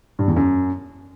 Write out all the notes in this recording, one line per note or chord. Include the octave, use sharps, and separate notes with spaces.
G2
E2
F#2